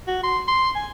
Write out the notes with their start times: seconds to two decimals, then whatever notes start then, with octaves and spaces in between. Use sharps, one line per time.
0.07 F#4
0.23 C6
0.48 C6
0.76 G#5